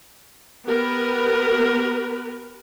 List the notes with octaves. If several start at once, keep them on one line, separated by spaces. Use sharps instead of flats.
B3 G4 A#4 B4